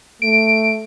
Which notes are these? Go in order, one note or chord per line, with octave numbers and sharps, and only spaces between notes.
A3 D7